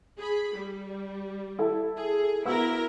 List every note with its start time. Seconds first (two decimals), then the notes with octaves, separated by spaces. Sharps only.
0.18 G#4 B5
0.55 G3
1.59 E4 A4
1.97 G#4
2.45 B3 E4 F#4 A#4 A#5 E6